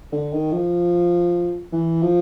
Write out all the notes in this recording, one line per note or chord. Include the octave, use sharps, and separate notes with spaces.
D3
D#3
F3
E3
F3